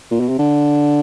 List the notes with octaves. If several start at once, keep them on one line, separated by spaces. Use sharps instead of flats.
A#2
B2
C3
D3